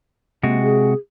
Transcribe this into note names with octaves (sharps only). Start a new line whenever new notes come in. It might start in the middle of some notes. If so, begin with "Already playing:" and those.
C3 G#3 A#3 F#4
G#4